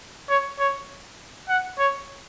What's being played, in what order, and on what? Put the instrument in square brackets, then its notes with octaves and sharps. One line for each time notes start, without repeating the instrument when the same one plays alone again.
[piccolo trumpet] C#5
C#5
F#5
C#5